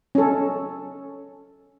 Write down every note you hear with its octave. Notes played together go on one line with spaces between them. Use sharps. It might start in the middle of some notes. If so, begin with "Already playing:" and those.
C#4 A4